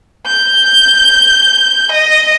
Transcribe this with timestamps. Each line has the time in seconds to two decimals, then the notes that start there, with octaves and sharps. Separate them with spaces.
0.26 G6
1.91 D#5